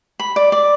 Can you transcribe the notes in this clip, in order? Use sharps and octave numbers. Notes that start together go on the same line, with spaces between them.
B5
D5
D5